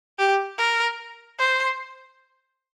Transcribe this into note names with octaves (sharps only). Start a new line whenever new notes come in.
G4
A#4
C5